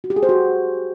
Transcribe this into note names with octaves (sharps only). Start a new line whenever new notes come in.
F#4
G4
G#4
C5
F#4